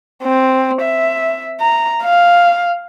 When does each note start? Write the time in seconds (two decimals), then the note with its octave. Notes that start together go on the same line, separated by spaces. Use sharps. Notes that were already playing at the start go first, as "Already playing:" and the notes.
0.24 C4
0.82 E5
1.60 A#5
2.04 F5